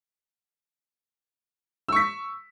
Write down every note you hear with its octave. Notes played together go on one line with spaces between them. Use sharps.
C#6 E6 B6